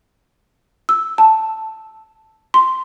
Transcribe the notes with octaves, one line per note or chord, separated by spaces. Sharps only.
E6
A5
C6